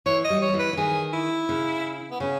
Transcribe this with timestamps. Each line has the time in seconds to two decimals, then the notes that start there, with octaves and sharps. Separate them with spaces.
0.06 E3 C#5
0.24 D#5
0.30 G3
0.42 C#5
0.49 G3
0.54 E3
0.59 B4
0.73 E3
0.77 D#3 G#4
1.13 E4
1.49 C#3
2.11 B3
2.20 C#3 C#4